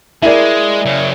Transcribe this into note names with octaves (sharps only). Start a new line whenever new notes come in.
G#3 E4 A#4 D5
C#3 F#3